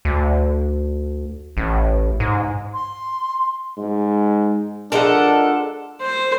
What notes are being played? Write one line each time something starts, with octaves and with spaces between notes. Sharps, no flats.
D2
A1
G#2
C6
G#2
F3 G#3 D4 A4 A#4 F#5
C5